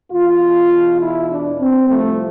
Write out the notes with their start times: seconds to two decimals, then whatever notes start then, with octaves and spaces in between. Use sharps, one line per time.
0.11 E2 B2 F4
1.00 E4
1.30 D4
1.59 C4
1.89 C2 C3 F3 A3